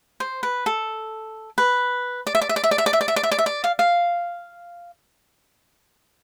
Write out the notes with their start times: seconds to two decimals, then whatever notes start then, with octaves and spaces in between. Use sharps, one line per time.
0.20 C5
0.43 B4
0.66 A4
1.58 B4
2.27 D5
2.35 E5
2.41 D5
2.49 E5
2.56 D5
2.64 E5
2.71 D5
2.78 E5
2.86 D5
2.93 E5
3.01 D5
3.08 E5
3.16 D5
3.23 E5
3.31 D5
3.38 E5
3.46 D5
3.64 F5
3.79 F5